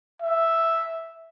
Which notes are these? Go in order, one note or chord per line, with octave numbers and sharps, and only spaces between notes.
E5